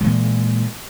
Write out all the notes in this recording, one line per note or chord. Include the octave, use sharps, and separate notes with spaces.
A#2 E3 G#3